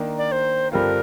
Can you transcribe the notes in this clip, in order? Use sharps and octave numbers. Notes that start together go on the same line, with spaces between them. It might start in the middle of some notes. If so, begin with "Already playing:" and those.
Already playing: D#3 A#3 D4
D5
C5
G2 D3 G3 C4 F4 A#4